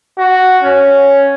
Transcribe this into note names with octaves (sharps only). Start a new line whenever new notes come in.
F#4
C#4